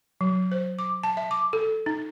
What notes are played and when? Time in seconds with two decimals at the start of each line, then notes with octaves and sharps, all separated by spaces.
0.21 F#3
0.52 C5
0.79 D6
1.03 A5
1.17 E5
1.31 D6
1.53 A4
1.86 D#4